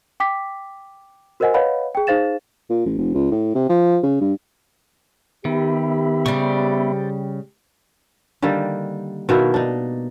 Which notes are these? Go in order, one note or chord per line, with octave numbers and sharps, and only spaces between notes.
G5 D6 B6
F#4 A#4 C5 D#5 F#5 G#5
B4 C#5 D#5 F5 F#5 B5
G#4 G5
D#4 G#4 C5 F5 A6 E7
A#2
A1
F1
C#2
A2
C3
F3
C#3
G2
D#3 B3 G4 E5 B5
C#3 G3 C5 D5 C#6
D3 D#3 G3 A#3
B2 D#3 A#3 E4
D4 D#4